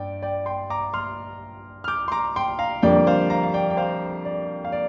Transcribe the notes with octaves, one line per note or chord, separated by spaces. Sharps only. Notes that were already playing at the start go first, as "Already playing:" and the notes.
Already playing: G2 D5 G5
D5 G5
G5 C6
A#5 D6
C6 F6
F6
D6 G6
C6
A#5 D6
G5 C6
F5 A#5
F2 D3 G3 A#3 D4 D5 G5
C5 F5
F5 A#5
F5
D5 G5
G5
C5 F5
D5
F5
D5